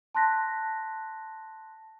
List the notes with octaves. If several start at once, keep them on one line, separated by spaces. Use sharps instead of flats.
A5 C6 F#6 A#6 B6